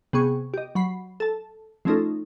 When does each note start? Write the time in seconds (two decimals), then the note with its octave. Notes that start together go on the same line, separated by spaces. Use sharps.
0.13 C3 B3 G#4 C#6
0.54 G4 D#5
0.75 F#3 B5 C7
1.20 A4 A5
1.85 F3 A3 C#4 D#4 F4 A4